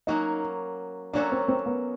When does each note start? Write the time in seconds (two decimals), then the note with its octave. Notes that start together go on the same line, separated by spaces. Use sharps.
0.07 F#3 A#3 C#4 D#4 F#4
1.13 F#3 A#3 C#4 D4 F#4 A4
1.32 C4
1.48 C4
1.66 B3